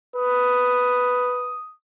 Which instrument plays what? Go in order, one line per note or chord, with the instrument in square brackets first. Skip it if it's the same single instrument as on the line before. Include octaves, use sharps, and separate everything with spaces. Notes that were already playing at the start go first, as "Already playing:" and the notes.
[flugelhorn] B4 [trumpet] D#6